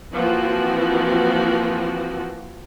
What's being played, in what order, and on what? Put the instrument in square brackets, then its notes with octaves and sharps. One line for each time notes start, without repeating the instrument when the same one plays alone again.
[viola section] E3 F3 A#3 C4 F#4